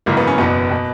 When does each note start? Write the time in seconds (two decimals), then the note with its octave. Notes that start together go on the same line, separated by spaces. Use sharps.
0.06 G#1 F#2 C#3 E3 A#3
0.17 B3
0.27 C#4
0.38 F#1 E2 B2 B3
0.71 B2